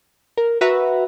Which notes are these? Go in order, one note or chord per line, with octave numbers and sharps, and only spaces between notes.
A#4
F#4 B4 E5 A#5